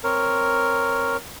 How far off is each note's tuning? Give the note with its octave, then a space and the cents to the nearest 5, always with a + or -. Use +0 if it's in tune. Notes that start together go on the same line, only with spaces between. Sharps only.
C4 +0 A#4 +0 C#5 +0